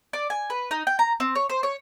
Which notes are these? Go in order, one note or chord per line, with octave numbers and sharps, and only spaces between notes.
D5
G#5
B4
D#4
G5
A#5
C4
C#5
C5
C#5